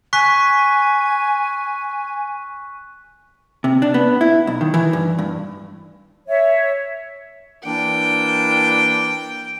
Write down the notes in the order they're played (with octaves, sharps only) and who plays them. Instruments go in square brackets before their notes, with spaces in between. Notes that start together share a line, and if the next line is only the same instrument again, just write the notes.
[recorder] G#5 [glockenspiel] C#6 F#6 B6
[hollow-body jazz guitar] C3
D4
B3
E4
B1
D#3
E3
G2
G2
[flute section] C#5 E5
[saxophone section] E3 A#3 D4 [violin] G5